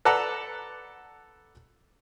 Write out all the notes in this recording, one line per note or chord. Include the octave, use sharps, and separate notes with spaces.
A4 B4 D5 F#5 A5 A#5